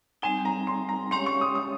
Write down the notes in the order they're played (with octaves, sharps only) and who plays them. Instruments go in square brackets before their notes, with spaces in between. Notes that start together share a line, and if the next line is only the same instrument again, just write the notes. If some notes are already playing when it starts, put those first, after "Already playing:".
[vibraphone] G3 C4 D#4 [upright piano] G#5
[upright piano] A#5
C6
A#5
[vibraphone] G#3 C#4 G4 C#5 F5 [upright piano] C6
[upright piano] C#6
D#6
D#6